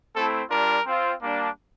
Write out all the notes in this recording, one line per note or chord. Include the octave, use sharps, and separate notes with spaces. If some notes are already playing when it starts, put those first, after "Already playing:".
A3 C4 E4 A4
G3 D4 F4 A#4
C4 F4
G3 A#3 D4